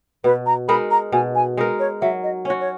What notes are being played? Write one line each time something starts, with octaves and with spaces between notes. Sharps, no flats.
B2 B4
A#5
G#3 D#4 A#4 B5
A#5
B2 G#5
G#5
G#3 D#4 A#4
C#5
F#3 E5
D#5
C#4 F#4 C#5
C#5